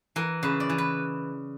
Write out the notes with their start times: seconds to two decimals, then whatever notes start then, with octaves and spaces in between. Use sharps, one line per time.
0.16 E3 A#4
0.43 C#3 B4
0.60 D5
0.69 E3
0.78 B4